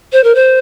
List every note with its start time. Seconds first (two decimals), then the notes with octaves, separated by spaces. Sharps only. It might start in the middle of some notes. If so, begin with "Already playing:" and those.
0.12 C5
0.24 A#4
0.35 C5